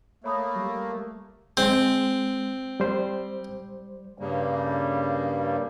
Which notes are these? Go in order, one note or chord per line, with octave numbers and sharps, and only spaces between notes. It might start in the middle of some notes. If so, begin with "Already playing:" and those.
A3 A#3 C#5 B5 D#6
G3
G#3 C4
G3 C5
G2 C#3 G3 A#3